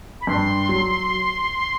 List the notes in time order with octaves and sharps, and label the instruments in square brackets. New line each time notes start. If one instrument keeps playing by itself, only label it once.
[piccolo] B5
[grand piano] G2 [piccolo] C6
[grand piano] F#3